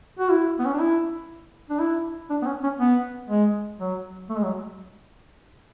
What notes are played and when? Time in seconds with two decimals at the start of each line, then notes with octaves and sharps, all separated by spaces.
0.19 F#4
0.31 E4
0.59 B3
0.65 C#4
0.73 D4
0.80 E4
1.70 D4
1.79 E4
2.30 D4
2.42 B3
2.46 C#4
2.63 C#4
2.79 B3
3.29 G#3
3.79 F#3
4.29 A3
4.37 G#3
4.43 F#3